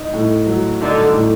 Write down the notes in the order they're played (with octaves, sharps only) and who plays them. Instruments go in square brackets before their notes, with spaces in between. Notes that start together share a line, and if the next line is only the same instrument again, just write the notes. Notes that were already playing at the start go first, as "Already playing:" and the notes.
Already playing: [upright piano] D#4
A2
F#3
[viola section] D3 [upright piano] D#4
[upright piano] A2